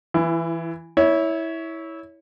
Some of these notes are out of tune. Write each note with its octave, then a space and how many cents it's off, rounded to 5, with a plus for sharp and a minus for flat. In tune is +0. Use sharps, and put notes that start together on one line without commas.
E3 +0 E4 +30
E4 -15 C#5 +15